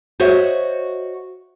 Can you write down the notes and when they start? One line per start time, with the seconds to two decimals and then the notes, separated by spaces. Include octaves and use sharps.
0.20 F#4 C5 C#5 D#5 E5